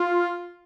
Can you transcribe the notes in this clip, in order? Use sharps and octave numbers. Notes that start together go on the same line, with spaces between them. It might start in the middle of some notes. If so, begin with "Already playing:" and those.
Already playing: F4